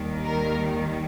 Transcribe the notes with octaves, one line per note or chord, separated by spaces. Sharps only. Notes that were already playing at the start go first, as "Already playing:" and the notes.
Already playing: D#2 D#3 G3
A#4